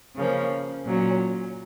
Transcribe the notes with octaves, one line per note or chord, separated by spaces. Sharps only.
C#3 F3 A#3 C#4
A#2 F#3 C#4